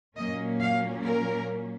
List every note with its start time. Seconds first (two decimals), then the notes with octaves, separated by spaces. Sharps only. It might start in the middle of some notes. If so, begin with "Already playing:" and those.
0.17 A#2 F#3 A#3 C#4 D#5
0.60 F5
1.03 A#4